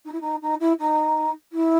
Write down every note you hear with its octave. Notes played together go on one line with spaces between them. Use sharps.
D#4
E4
D#4
D#4
E4
D#4
E4